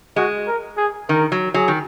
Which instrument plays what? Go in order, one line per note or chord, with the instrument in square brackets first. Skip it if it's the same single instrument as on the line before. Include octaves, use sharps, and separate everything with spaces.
[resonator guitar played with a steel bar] G#3 [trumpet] F#4
[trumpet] A#4
G#4
[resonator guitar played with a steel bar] D#3 [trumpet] A#4
[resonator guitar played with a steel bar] F#3
[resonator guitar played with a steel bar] F#3 [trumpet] G#4
[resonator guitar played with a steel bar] D#3